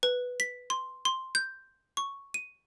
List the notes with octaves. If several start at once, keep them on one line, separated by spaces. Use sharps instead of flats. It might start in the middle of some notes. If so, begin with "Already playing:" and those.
B4
B6
C6
C6
G6
C#6
D#7